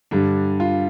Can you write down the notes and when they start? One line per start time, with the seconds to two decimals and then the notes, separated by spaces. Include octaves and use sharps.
0.11 G2 D3 G3 D4
0.60 F4